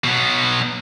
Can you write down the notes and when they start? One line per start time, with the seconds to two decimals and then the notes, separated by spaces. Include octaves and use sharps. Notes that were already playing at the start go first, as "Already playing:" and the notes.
0.04 B2 F#3